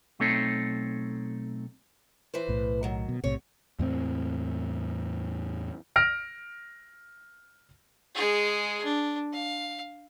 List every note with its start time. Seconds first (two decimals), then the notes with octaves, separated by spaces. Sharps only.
0.20 B1 A3 C4 D#4 A4 C#5
2.34 E3 B4 C5
2.49 B1 A2
2.83 D#3 F#3
3.09 B2
3.24 B1 A2 C3 C#5
3.79 E2 A2 C4
5.96 F6 A#6 D7
8.15 G#3 G#4
8.84 D4
9.33 F5